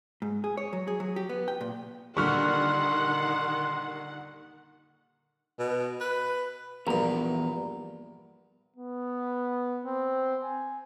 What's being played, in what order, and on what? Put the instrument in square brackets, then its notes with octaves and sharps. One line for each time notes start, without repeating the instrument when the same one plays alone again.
[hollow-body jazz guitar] G#2
G#4
C#5
F#3
G#4
F#3
G4
B3
G5
A#2
[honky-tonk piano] A#2 D3 G3 [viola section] D#3 F#5 [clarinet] C6 [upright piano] C#6 F6
[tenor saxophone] B2
B4
[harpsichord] A#1 G2 [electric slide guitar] E2 B3 A#5
[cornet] B3
C4
G#5